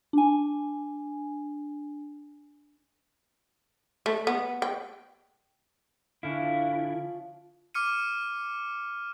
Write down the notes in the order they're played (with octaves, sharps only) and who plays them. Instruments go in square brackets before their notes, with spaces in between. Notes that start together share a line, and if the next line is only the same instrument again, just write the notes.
[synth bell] D4 G#5
[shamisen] A3
B3
G5
[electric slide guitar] D3 E4 [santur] C#4 F5
[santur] F3
[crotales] D6 F6 C#7 D#7